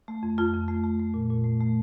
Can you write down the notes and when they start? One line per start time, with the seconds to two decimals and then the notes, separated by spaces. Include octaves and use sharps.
0.08 A3
0.23 F2
0.38 F2 F4
0.54 F2
0.68 A3
0.84 A3
0.99 A3
1.14 A#2
1.30 A#2
1.44 A3
1.60 A3